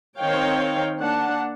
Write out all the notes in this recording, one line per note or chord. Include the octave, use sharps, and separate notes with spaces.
D#3 C4 C#5 F5 G5
A#3 D4 F#5 A5